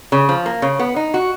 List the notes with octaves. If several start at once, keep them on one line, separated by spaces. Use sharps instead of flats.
C#3
F3
A#3
C#3
B3
D#4
F#4